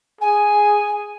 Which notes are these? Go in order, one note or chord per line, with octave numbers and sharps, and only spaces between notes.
G#4 G#5